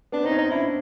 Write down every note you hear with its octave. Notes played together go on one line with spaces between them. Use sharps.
B3 D4
C4 D#4
C#4
D#4
D4 E4